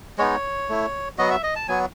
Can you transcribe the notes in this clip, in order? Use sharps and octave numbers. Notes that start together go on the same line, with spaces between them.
G#3 B3 D#4 C#5
A3 E4
F#3 B3 F#4 D#5
E5
D#5
A5
F#3 B3 F#4 G#5